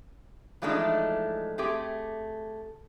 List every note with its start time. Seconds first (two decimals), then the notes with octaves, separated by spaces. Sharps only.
0.62 E3 F3 G#3 A3 D4 D#4
1.58 A3 C4 G4 G#4